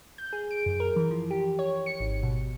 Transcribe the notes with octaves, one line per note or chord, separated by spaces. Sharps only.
G6
G#4
D7
F#2
A#4
E3
F3
G4
C#5
C#7
G#1
B2